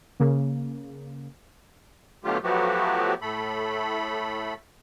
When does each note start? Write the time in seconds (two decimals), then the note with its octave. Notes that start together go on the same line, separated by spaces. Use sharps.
0.20 C#3 A#3
2.24 B2 D3 F#3 A3 F4 G4
2.43 F3 F#3 A3 B3 F#4 G4
3.21 A2 A3 A4 B5